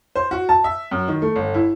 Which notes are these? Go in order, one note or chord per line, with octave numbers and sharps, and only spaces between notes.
C5
F#4
A5
E5
F#2
D#3
A3
G1
E4